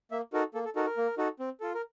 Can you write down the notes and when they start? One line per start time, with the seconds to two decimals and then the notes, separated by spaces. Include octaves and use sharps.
0.11 A#3 E5
0.33 D#4 F#4 A4 A#4
0.54 A#3 A4
0.65 A4
0.76 D#4 F#4 A4 A#4
0.86 A#4
0.97 A#3
1.18 D#4 F#4 A4
1.39 C4
1.60 F4 A4
1.74 A#4